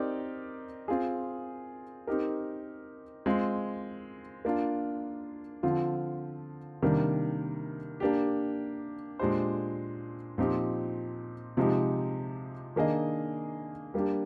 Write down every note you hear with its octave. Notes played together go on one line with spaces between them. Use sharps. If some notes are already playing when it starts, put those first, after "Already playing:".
Already playing: C4 D#4 G4 A#4 D5
C4 F4 G#4
C4 D#4 G4 A#4
G#3 C4 F4
A#3 D4 F4
D3 F3 C4 F4
C3 D#3 G3 A#3 D4
A#3 D4 G4
A#2 G#3 D4 G4 C5
A#2 F3 C4 D#4 G4
C3 F3 G#3 D#4 G4
D#3 A#3 D4 G#4 D#5
G3 A#3 D4 G4